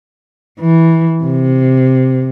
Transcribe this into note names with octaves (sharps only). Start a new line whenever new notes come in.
E3
C3